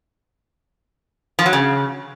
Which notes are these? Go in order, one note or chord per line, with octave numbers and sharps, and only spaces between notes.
F3
F#3
C#3